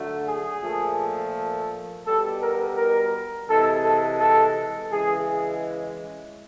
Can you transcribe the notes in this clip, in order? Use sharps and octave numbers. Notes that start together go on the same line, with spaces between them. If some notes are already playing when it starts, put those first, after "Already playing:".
Already playing: D3 F#3 A3
G#4
A#2 F3 A3
B2 G3 A4
A#4
A#4
C3 E3 G#3 A4
A4
A4
C#3 E3 G#3 G#4